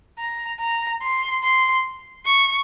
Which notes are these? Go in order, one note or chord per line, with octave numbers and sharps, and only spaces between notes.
A#5
A#5
C6
C6
C#6